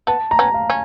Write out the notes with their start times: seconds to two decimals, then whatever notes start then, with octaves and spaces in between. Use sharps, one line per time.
0.07 B3 A5
0.31 A#5
0.39 B3 C#4
0.54 F5
0.70 C#4